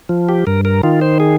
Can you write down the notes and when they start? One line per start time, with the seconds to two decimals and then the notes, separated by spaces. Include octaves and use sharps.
0.09 F3
0.29 G4
0.47 G2 A#4
0.65 A#4
0.83 D#3 F4
1.01 C5
1.20 G#4